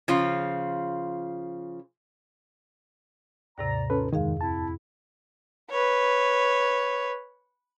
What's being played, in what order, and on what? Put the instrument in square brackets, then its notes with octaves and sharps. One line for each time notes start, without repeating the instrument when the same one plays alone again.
[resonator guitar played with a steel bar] C#3 F3 F4
[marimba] D#2 G#2 C3 [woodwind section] D5 A#5
[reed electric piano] C#4 A4 B4 [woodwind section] D#4 F4
[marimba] F2 G#4 F5 [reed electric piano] D#3 [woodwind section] G#3
[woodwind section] C4 E4 [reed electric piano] A5
[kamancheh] B4 C#5